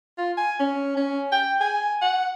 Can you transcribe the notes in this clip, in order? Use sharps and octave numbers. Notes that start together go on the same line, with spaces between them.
F4
G#5
C#4
C#4
G5
G#5
F#5